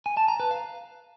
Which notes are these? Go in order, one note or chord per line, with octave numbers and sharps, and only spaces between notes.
G#5
A5
A#5
B4
F5